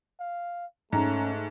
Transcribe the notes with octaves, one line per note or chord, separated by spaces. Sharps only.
F5
G#2 A3 C#4 A#5